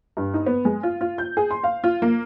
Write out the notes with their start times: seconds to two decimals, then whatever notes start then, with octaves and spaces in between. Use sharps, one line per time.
0.17 G2
0.34 D#4
0.46 B3
0.65 G#3
0.83 F4
1.01 F4
1.18 G6
1.37 G#4
1.51 C6
1.64 F5
1.84 F4
2.02 A#3